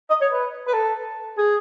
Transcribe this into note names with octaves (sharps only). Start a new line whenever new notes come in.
D#5
C#5
B4
B4
A4
G#4